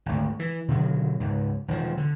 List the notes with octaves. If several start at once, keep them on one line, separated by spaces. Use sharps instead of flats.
G#1 D2
E3
B2 D3 D#3 F#3
C#2 G#2
E1 D#3 F3
D3